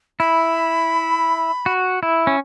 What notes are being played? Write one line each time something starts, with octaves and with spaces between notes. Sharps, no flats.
E4 B5
F#4
E4
C#4